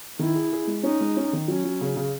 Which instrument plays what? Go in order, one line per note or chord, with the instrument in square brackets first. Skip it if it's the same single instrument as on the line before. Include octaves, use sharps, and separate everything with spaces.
[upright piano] D#3 [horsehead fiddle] E4
[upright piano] G#4
G#4
G#3
[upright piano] C#4 [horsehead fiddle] D#4
[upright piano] G#3
C#4
D#3
[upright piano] F#3 [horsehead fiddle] C#4
[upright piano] F#3
C#3
C#3